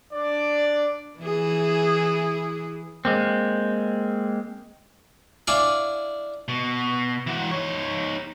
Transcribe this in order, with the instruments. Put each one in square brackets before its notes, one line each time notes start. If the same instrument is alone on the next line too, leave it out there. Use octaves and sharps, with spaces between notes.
[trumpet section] D4 D5
[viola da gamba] E3 E4 G#4
[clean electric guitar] G#3 A#3 C4
[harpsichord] D4 E4 D5 F5 G#5 C#6
[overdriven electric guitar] B2
E3 F#4
D#4 C#5